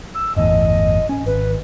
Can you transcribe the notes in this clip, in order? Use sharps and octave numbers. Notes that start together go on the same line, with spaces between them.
E6
G1 E2 A2 D#5
C#4
G#1 B4